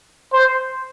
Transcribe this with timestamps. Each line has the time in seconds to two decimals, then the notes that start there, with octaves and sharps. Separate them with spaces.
0.33 C5